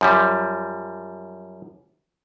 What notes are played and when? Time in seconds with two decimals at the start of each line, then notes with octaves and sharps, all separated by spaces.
0.01 F#2 F3 G3